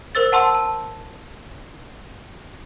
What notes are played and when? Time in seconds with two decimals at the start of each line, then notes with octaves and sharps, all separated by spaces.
0.15 A#4 C5 E6 A6
0.32 F#5 A5 C6 E6
0.55 A5